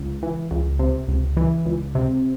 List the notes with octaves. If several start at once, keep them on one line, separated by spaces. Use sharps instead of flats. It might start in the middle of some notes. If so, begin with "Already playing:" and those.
Already playing: C#2
E3
C#2
C3
C#2
E3
C#2
C3